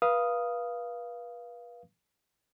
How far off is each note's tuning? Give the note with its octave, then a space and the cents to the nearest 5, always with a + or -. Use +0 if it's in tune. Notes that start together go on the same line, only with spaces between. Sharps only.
B4 -35 F5 -10 D#6 +0